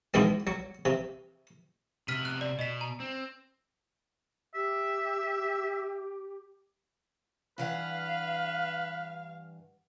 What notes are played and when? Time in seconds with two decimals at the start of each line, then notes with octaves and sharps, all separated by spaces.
0.14 G#2 B2 E3 G#3 C4
0.47 F#3
0.85 C3
2.08 C3 B3 F6 B6 D#7
2.25 F#6
2.41 D5
2.59 B2 D#5 B6
2.81 A#5
3.00 C4
4.55 G4 E5
7.58 G2 E3 B4 F5 F#5